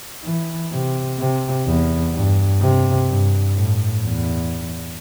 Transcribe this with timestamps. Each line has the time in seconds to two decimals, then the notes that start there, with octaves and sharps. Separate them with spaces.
0.24 E3
0.72 C3
1.18 C3
1.66 E2
2.14 G2
2.61 C3
3.08 G2
3.55 A2
4.03 E2